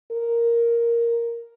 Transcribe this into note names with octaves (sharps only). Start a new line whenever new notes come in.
A#4